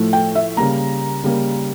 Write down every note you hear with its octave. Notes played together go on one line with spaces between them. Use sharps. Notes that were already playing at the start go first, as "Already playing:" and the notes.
Already playing: A2 F3 A3
G5
E5
C#3 G3 A#3 A#5
C#3 G3 A#3